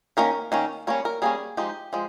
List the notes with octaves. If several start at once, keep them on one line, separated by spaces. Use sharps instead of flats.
D#3 A#3 C#4 A#4
D#3 A#3 C#4
G3 A#3 C#4 C#5
A#4
G3 A#3 C#4 G#4
F3 G#3 D#4 G4
F3 G#3